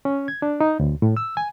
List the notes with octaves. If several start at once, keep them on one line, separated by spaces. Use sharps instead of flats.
C#4
G#6
D4
D#4
D2
A2
E6
G#5